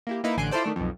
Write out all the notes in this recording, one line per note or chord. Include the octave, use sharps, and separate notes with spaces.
A#3 E4 G4
A#3 D#4 E4 B4
A1 D3 G#5 C6 F#6 D7
E4 F4 A4 C5 D5
D#3 A3 D4
B1 F2